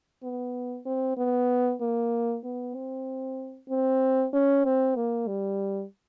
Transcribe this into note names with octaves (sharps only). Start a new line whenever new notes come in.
B3
C4
B3
A#3
B3
C4
C4
C#4
C4
A#3
G3